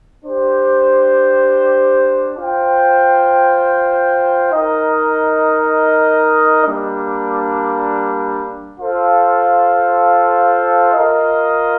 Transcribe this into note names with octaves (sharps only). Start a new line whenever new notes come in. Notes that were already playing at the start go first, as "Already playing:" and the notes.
D4 G4 C5
F4 C5 G5
D#4 A#4 D#5
G3 A#3 D4
F4 A4 C5 F5
F4 A#4 D#5